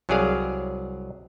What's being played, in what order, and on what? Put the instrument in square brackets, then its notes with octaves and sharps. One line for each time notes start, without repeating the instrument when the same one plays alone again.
[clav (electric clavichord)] C2 F#3 G4 G#4 D5 F5